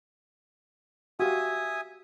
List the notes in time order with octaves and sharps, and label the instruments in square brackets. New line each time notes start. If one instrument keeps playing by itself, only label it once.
[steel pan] F#4 G4 F5 [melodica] E5 G#5 D#6